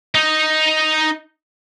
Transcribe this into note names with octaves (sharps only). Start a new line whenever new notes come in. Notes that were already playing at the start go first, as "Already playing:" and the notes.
D#4